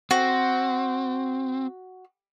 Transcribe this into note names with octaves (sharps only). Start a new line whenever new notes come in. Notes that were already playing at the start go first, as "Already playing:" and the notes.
C4 F#4